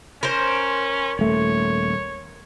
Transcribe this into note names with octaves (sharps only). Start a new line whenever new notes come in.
C#4 A#4 C5
D#1 A3 C#5